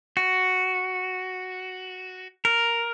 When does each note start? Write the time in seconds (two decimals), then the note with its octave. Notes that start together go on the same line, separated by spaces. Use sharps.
0.17 F#4
2.45 A#4